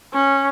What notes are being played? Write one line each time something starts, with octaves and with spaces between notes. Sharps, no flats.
C#4